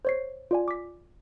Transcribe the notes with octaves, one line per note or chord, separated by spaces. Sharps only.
C5 C#5 C7
F4 D5 G#5
D6 B6